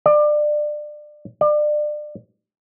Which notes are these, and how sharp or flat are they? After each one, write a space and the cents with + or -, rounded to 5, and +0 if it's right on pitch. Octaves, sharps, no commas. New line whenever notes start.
D5 +25
D5 +30